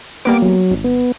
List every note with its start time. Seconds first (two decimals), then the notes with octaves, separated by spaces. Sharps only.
0.25 G3 A#3 B3 D6
0.42 F#3
0.71 G#1
0.84 B3